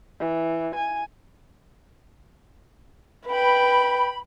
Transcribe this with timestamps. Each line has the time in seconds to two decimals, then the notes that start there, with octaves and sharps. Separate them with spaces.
0.19 E3
0.75 G#5
3.28 B4 G5 B5